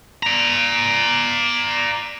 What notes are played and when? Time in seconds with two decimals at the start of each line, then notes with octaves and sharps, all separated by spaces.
0.23 D5 A#5